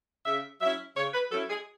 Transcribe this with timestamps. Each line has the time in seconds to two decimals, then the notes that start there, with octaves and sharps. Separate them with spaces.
0.26 C#3 E5
0.61 F#3 C#4 E4 E5
0.96 C#3 C#5
1.13 B4
1.31 F#3 C#4 E4 A4
1.50 G#4